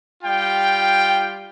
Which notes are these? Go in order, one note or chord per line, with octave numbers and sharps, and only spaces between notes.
G3 F4 G5